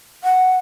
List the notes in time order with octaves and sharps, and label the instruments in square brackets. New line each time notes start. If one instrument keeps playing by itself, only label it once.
[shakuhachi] F#5